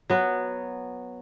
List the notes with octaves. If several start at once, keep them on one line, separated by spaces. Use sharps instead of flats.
F#3 B3